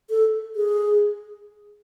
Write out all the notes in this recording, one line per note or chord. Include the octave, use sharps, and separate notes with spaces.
A4
G#4